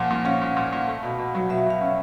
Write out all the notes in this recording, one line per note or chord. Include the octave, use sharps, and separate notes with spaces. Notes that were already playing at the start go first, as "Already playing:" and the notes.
Already playing: A#2 F3 A#3 F#5
A#2
C#4 F5
A#2
A#2
A#2
A3
B2
B2
F#3
B2 E5
B2 F5
C#4